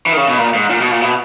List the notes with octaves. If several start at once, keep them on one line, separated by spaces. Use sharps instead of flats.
E3
D#3
C#3
B2
A#2
G#2
A#2
B2
A#2
B2